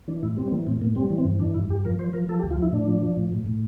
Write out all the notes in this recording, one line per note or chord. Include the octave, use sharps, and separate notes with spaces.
E3 D4
A2 E4
G3 C4
C4
E3 A#3
A2 C4
A2 A#3
G3 C4
E3
C4
G2
E3 D4
G2 E4
G2 G4
F3 A#4
F3 C5
F3 A#4
F3 A4
G4
D2
F4
F3 E4
A2 D4
F3
F3
A2
A2
A2